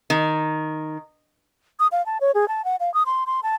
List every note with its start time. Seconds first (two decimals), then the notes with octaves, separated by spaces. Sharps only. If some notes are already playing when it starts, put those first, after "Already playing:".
0.10 D#3
1.80 D#6
1.92 F5
2.06 A5
2.21 C#5
2.35 G#4
2.48 A5
2.65 F#5
2.80 F5
2.94 D#6
3.06 C6
3.26 C6
3.43 A5